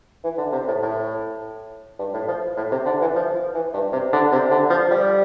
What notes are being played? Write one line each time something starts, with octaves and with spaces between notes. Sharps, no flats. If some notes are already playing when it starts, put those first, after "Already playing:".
E3
D3
C3
A2
A2
G2
A2
F3
A2
C3
D3
E3
F3
E3
G2
C3
D3
C3
D3
F3
G3